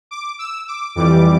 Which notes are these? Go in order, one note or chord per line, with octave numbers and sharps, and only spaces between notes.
D6
E6
D6
F2 E3 G3 D6